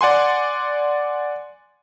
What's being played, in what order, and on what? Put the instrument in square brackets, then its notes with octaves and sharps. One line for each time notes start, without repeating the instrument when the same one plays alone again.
[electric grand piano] D5 F#5 G#5 C6